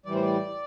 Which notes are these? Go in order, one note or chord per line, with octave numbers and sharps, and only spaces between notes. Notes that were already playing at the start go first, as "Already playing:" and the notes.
A2 E3 G3 D5
C5
D5